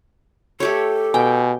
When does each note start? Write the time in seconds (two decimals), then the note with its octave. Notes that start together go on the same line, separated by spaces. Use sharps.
0.60 A3 G4 A4 C#5
1.14 B2 G5 G#5